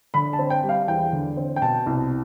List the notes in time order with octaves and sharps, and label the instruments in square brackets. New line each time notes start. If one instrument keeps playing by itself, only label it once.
[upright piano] D3 B5
A5
C4
G5
G3
F5
E2 G5
D3
C4
G5
B2 A5
C2